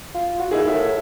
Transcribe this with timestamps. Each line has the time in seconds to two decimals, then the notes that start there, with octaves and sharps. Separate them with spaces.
0.15 F4
0.39 F#4
0.51 D#2 D#4 E4 G#4
0.68 A2 E5